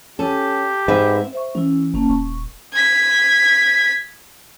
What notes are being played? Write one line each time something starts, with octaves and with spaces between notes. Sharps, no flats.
C#4 G4 A4
G#2 C4 B4 E5
C5 E5 C#6
E3 C#4 E4
F#1 A#3 C#4 A5
D#1 C#6
G#6 B6